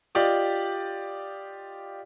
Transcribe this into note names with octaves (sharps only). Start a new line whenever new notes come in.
F4 G4 D5 D#5